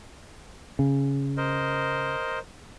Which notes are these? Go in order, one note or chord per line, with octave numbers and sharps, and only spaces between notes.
C#3
A#4 C5 D#5